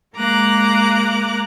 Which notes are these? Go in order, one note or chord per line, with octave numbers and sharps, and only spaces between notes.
G#3 A#3 A#5 D6 F#6